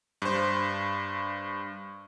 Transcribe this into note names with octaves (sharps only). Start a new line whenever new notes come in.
G2 C5